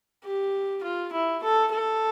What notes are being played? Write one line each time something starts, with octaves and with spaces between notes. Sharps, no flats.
G4
F4
E4
A4
A4